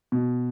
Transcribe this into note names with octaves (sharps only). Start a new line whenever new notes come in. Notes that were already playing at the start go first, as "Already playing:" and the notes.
B2